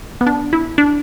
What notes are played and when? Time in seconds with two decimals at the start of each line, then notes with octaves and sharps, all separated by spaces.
0.21 B3
0.27 D4
0.53 E4
0.78 D4